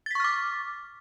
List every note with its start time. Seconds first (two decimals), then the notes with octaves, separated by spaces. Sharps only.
0.06 A6
0.11 B6
0.15 C#6
0.20 F6
0.24 D6